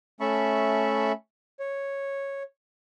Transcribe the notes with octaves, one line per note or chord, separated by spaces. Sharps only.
A3 C#4 E5 A5 B5 C#6
C#5